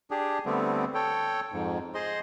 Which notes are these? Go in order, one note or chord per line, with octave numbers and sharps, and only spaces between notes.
D4 G4 G#4
D3 G3 A3 B3 C4
A4 C#5 G5
F2 G#2
G#4 C5 D#5 C6